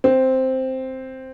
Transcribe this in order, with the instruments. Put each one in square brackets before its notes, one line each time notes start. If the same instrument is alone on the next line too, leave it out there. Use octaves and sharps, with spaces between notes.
[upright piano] C4